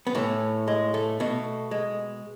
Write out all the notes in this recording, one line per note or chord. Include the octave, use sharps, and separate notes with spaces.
B3
A2 E3 A3
G#3
A3
B2 A3
G#3